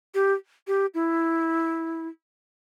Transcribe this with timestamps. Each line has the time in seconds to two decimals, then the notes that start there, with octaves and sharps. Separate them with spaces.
0.14 G4
0.67 G4
0.94 E4